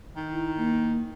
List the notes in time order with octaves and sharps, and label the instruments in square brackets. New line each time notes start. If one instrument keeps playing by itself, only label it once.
[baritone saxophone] D#3
[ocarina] E4
A#3